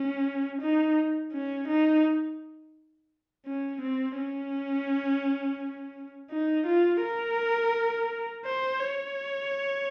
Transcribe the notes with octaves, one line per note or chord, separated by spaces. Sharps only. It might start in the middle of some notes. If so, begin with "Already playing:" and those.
Already playing: C#4
D#4
C#4
D#4
C#4
C4
C#4
D#4
F4
A#4
C5
C#5